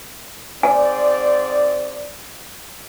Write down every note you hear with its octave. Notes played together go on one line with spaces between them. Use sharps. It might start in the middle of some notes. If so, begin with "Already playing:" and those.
G#2 C4 D5 G#5